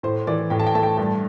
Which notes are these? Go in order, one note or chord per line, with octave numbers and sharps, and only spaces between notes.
A2 C5
E3 D5
A2 G5
A5
G5
A3 A5
G5
G2 A5